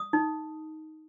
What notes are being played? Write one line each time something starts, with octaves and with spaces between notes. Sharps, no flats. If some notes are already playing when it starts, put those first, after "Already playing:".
Already playing: D#6
D#4